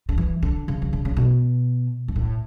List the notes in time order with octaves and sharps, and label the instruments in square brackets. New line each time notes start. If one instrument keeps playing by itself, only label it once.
[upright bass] D3
E3
D3
C#3
E3
D3
C#3
B2
G#2
A2